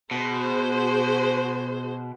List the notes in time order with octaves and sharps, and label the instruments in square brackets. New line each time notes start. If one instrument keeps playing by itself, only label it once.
[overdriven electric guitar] B2 [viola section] F#4 G#4 C5